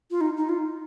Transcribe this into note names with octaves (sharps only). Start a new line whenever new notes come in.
F4
D#4
D#4
F4